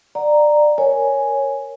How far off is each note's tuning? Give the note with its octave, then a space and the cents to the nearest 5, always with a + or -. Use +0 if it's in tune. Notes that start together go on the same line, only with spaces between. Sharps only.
D5 +20 F#5 +0 A#5 +0
A#4 +5 C#5 +0 G#5 +0